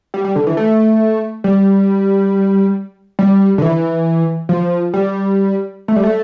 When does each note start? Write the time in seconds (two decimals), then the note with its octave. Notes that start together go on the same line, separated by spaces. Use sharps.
0.14 G3
0.24 G3
0.36 D3
0.47 E3
0.57 A3
1.44 G3
3.19 G3
3.58 D3
3.62 E3
4.49 F3
4.94 G3
5.88 A3
5.96 G3
6.03 A3